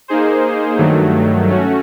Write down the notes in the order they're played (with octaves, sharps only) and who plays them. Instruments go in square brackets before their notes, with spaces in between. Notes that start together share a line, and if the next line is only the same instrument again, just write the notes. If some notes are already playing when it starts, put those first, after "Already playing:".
[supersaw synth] A#3 D#4 G#4 C5
G2 D#3 F#3 A3
A3 C#4 F#4